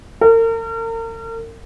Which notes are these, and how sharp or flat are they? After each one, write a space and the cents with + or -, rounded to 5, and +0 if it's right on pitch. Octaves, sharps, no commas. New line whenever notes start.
A#4 -40